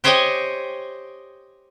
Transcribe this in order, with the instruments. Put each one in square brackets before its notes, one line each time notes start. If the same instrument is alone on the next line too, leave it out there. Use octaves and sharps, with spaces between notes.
[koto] G4 C5 C#5 D#5 G5 G#5